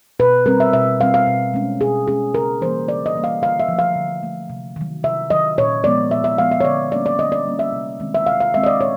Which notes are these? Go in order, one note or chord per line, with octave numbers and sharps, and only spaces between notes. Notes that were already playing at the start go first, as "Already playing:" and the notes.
B2 B4
G3 C4 A#4
E5
B2 E5
G3 C4 F5
F5
B2
G#3 C#4
B2 G#4
G#3 C#4 G#4
C#3 A#4
E3 G3 A#3 C5
C#3 D5
D#5
E3 G3 A#3
F5
D3 F5
E5
F3 A3
F5
D3
F3 A3
C3
D#3 F#3
C3 E5
D#3 F#3 D#5
A#2 C#5
F3 G#3 B3 D5
A#2 E5
E5
F3 G#3 B3 F5
E5
C#5
D3 D5
G3 A#3 C#4 D5
D5
D3 D#5
D5
G3 A#3 C#4
E5
C3
D#3 G#3 C4
E5
C3 F5
F5
D#3 G#3 C4 E5
D#5
D5
A#2 C#5